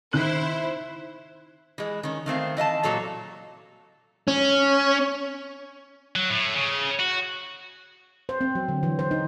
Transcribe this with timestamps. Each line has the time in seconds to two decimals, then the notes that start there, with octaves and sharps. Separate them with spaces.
0.13 D#3 E4 C5 F#6 F#7
1.78 E3 G#3
2.03 D#3 C#4
2.26 D#3 A3 C4 F5
2.57 E3 D#5 F5 A5
2.83 A#2 F#3 A4 A#5
4.28 C#4
6.16 F#3
6.30 A2
6.56 C#3
7.00 F#4
8.29 C5
8.41 C4
8.55 F#3
8.68 D3
8.83 E3
8.99 C5
9.11 D#4